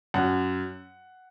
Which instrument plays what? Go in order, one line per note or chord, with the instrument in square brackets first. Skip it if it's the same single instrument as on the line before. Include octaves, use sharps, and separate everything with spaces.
[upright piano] F#2 F#5